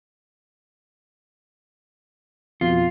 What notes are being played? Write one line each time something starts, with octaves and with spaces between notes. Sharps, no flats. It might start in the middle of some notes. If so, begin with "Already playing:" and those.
F2 B2 F4